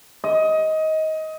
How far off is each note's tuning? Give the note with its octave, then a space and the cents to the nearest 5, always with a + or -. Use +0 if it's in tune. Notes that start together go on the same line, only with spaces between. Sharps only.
D#5 +20